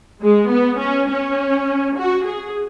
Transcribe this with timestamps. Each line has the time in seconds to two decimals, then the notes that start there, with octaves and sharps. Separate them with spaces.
0.22 G#3
0.52 B3
0.80 C#4
1.09 C#4
1.96 F#4
2.25 G#4